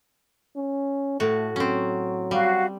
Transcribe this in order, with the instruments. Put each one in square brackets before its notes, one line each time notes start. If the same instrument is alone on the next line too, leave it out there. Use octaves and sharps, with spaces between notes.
[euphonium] C#4
[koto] A2 F#4 [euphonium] A3
[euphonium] F#3 [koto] C4 C#4
[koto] G3 [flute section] F#4 F5